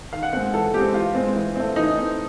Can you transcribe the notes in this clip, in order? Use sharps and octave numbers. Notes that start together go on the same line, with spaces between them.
D#3 F5
F#5
G#3 C4 F#5
E3 A4
G#3 C4 G4
E3 F4
G#3 C4
E3
A3 C4
E3 D#4
A3 C4